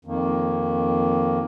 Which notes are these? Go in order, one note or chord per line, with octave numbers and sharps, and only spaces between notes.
F2 D#3 A#3